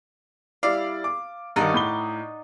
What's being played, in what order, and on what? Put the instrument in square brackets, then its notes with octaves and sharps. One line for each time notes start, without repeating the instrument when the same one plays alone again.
[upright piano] G3 E4 D5 [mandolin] F5
[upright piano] D6
[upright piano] G2 D#3 [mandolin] D#4 D5 F#5
[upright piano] A2 B5 G7